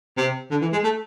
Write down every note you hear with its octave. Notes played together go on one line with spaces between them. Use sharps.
C3
D3
E3
G#3
A3